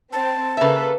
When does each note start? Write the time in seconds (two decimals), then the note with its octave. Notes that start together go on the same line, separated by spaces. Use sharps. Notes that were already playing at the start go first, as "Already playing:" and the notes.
0.13 C4 A5
0.57 C#3 A#3 A4 B4 E5